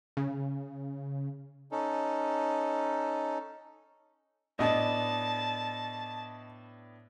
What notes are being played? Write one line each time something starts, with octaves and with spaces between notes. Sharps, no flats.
C#3
C#4 D#4 A4
A2 B3 D4 D#5 A5